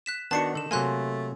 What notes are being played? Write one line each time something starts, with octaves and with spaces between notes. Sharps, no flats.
F#6 B6 E7
D#3 B3 D4 F#4 A5 C7 C#7
D3 A4 E7
C3 F#3 A3 A#3 G#5 C6 F#6